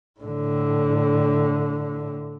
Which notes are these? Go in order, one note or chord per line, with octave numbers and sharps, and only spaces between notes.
A2 D3